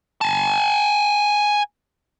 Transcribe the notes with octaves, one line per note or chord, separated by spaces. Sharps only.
G#5 A5